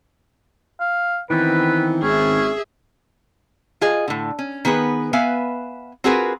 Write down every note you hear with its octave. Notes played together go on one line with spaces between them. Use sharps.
F5
D#3 E3 B3 C4 B4
G#1 C#4 G#4 E5
F4 G#4 D#5
A2 D3
C#4
D#3 B3 G#4 B4
B3 B4 E5 F5 G#5
C4 F4 F#4 G#4 A#4 B4